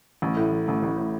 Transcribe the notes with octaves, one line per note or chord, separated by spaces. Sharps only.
A1
A2
E3
A1
A1
A2